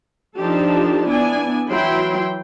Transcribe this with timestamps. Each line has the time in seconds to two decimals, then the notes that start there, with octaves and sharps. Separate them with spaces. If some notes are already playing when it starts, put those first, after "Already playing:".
0.37 F3 D4 D#4 G4 A4 A5
1.07 B3 D4 E4 D5 G#5
1.71 E3 F#3 E4 G5 C6